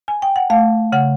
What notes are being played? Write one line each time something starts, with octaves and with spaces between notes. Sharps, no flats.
G#5
G5
F#5
A3 F5
C#3 F#5